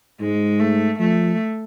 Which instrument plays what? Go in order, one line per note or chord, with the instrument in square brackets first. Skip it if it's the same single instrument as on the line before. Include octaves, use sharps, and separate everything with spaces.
[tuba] G#2 [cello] G#3
[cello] A3
[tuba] F3 [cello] A3